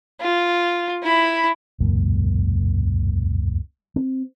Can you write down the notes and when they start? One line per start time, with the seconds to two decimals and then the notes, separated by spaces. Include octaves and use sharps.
0.20 F4
1.03 E4 B5
1.80 E1 C#2 F#2 A#2
3.96 C4